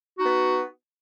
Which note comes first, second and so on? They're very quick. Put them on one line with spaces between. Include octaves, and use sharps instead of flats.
F#4 D#4 B3